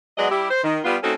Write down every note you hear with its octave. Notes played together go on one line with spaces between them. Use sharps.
F#3 G#3 B3 G#4 D5 D#5
G3 E4 G4
C5
D#3
G3 B3 F4
A3 C4 C#4 D#4 F#4 A4